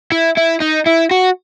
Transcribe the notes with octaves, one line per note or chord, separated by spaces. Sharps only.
E4
E4
D#4
E4
F#4